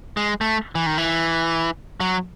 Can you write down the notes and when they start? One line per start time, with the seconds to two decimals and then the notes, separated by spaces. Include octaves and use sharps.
0.17 G#3
0.41 A3
0.75 E3
0.86 D#3
0.98 E3
2.00 F#3